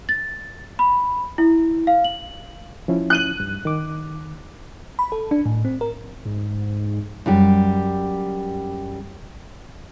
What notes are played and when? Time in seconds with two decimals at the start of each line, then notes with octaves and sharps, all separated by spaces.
0.09 A6
0.79 B5
1.38 E4
1.87 F5
2.04 F#7
2.88 F3 C#4 E4
3.10 F#6 D#7 F#7
3.40 G2
3.65 D#3 D6
4.99 B5
5.12 A4
5.31 D4
5.46 A2
5.65 C4
5.81 A#4
6.25 G#2
7.26 F#2 G3 G4